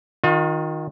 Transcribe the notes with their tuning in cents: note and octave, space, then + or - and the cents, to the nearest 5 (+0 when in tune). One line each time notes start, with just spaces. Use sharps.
D#3 +5 F4 +40